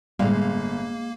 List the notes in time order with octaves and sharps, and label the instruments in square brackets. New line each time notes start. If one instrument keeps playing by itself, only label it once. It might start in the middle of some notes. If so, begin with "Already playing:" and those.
[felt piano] G1 [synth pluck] A2 G3 [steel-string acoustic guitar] G#3 F5 [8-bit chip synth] A#3